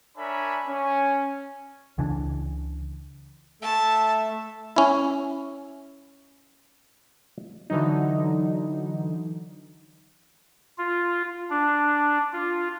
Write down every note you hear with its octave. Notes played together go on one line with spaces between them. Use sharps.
D4 A#4 C#5 E5 G#5 B5
C#4
C#2 C#3 E3 D4
A3 A4 E5 A5
C#4 E4
D3 E3 F#3 D#4
F4
D4
F4